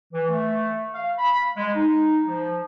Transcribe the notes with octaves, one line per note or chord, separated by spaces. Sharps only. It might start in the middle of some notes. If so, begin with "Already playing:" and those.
E3
A3
F5
B5
G#3
D#4
F3